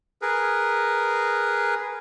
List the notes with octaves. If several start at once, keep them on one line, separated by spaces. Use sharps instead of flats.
G#4 A#4 B4